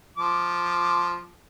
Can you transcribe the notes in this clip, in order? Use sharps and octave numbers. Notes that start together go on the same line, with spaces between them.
F3 D6